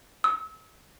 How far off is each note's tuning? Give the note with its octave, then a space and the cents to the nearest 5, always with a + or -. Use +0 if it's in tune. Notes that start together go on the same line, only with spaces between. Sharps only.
E6 -35